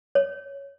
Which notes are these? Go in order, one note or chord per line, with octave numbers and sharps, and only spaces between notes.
C#5